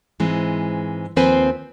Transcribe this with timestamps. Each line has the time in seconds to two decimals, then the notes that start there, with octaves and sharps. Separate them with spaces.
0.20 G#2 E3 G#3 C4
1.16 D#2 F3 C4 B4 C5 G#5